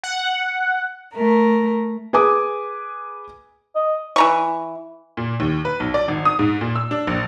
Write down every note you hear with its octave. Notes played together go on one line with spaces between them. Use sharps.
F#5
A3 A#4
G#4 B4 G#5 D6 D#6
D#5
E3 A#5 C#6
A#2
D#2
B4
B1
D5
G#1
D#6
G#2
A#2
E6
D4
A#1